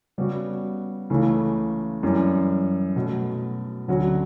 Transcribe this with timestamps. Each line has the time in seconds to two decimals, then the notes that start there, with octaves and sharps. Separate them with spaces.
0.18 C#3 G3 B3 F#4
1.10 C#2 C#3 E3 A3
2.03 F#2 E3 G3
2.96 B2 F#3 A3
3.88 D2 D3 F#3 C#4 F#4